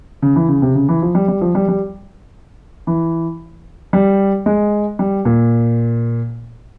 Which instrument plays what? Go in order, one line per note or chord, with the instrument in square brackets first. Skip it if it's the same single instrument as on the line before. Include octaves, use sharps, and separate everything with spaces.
[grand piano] C#3
E3
C#3
C3
C#3
E3
F3
G3
G3
F3
G3
G3
E3
G3
G#3
G3
A#2